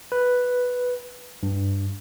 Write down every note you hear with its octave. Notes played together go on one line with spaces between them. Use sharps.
B4
G2